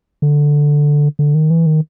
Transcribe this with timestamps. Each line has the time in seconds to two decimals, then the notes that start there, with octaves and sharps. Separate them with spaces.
0.22 D3
1.19 D3
1.34 D#3
1.50 E3
1.66 D#3